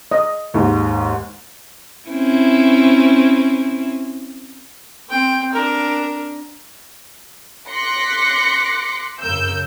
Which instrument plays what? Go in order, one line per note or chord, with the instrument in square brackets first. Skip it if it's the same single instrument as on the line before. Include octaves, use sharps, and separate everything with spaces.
[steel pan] D#5
[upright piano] D#2 G#2
[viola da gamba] C4 C#4 E4
[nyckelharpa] C4 G5
D4 A#4
[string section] C6 D6 F#6 A#6 B6 C#7
F#2 C#3 A#4 E6 G6